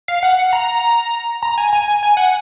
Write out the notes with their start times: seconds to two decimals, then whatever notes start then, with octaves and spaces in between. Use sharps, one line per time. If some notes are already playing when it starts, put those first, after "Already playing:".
0.08 F5
0.23 F#5
0.53 A#5
1.43 A#5
1.58 G#5
1.73 G#5
2.03 G#5
2.17 F#5